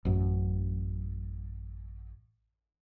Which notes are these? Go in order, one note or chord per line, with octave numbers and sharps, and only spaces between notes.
A1 F#2